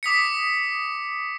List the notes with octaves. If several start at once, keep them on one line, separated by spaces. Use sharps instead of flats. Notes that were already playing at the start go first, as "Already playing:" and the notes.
D6 D#6 B6 C#7